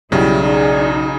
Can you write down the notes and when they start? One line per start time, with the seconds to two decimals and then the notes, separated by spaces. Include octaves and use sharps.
0.12 B1 C#3 G3 E4
0.43 D#4 G#4 D5